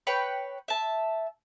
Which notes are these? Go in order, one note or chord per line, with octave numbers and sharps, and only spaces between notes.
B4 C#5 G5 B5
E5 A5